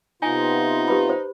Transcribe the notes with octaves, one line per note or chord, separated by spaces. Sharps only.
C3 B3 D#4 F4 G#5
G4 B4 B5
C5